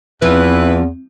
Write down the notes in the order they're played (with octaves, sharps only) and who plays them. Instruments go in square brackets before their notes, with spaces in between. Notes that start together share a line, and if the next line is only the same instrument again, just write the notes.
[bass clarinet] E2 [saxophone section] E3 B4 [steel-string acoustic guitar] F3 [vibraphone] C4